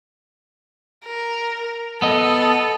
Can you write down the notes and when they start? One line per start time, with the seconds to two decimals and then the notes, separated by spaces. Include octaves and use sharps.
1.06 A#4
2.02 B3 A4 D#5